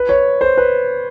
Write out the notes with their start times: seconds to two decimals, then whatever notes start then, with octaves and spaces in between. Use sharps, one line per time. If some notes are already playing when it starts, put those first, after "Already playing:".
Already playing: B4
0.09 C#5
0.41 C5
0.57 B4